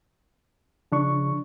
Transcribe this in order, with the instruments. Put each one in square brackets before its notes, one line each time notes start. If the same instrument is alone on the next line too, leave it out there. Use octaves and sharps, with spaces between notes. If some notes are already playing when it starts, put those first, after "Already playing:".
[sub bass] C#3 [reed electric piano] F3 D4 C#6